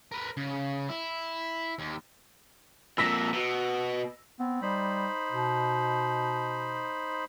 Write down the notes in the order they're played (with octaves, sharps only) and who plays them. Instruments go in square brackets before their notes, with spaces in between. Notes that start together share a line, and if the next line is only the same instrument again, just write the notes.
[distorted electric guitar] A#4 B4
C#3
E4
D#2
[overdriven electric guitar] F2 A#2 [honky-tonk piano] E6 A#6 B6
[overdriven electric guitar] B2
[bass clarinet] B3 [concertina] C4
[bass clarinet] G3 [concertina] D#4 C5 B5
[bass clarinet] B2